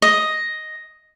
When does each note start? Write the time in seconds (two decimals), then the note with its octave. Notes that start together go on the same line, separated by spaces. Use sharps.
0.02 D#5